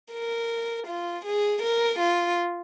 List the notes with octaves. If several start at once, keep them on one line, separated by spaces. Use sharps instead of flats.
A#4
F4
G#4
A#4
F4